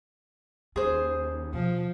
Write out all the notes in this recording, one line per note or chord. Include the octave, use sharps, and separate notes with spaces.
D#2 C#4 G#4 C5
B2 F3